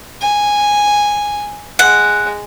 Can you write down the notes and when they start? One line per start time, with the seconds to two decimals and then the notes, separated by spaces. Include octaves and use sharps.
0.21 G#5
1.79 G#3 F#5